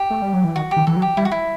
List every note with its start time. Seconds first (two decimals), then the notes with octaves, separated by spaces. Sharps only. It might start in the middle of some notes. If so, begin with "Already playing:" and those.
Already playing: G4
0.10 A3
0.22 G3
0.33 F#3
0.44 E3
0.56 D#3 F#4
0.71 G4
0.76 D#3
0.87 E3 A4
0.96 F#3
1.02 G4
1.17 G3 E4
1.25 F#4
1.31 E4